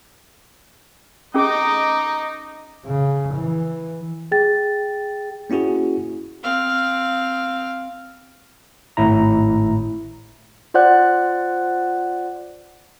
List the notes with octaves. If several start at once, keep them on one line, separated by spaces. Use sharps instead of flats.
C#4 D#4 G#4 D#5 D6
C#3
E3
G#4 G5 A6
A#3 C#4 E4 F#4 G#4
C4 F5
G#1 A2 E4 A#5
F4 C5 D5 F#5 F#6